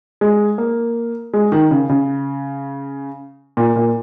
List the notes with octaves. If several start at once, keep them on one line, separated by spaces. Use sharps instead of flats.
G#3
A#3
G#3
D#3
C#3
C#3
A#2
A#2